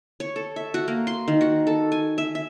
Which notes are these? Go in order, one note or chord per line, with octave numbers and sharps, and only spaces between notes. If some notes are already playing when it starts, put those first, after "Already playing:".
C#5
A4
E5
F#4
A#3
C6
D#3
F#4
A4
G#5
E5
E5